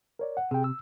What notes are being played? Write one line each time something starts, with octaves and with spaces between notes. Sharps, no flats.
A#4 C#5 D5
F#5
C3 G#4 G5
E6